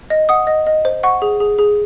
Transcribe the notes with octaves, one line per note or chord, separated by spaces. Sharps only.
D#5
F#5 D#6
D#5
D#5
C5
F#5 C#6
G#4
G#4
G#4